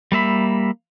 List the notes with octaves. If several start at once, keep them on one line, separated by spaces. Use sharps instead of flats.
G3 A#3 E5 B5